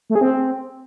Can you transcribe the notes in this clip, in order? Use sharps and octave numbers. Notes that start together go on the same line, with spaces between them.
A3
G#4
C4